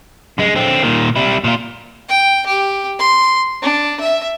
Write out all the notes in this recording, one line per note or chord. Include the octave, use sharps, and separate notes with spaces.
F#2 G#3
D3 C4
A#2 D#3
G3 E4
A#2 F4
G5
G4
C6
D4
E5